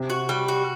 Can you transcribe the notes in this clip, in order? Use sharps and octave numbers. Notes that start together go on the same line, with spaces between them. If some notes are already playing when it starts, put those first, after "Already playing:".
Already playing: C3
F#4
G3
F#4